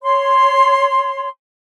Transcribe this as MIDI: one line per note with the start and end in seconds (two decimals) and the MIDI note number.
0.02 1.28 73
0.02 1.28 84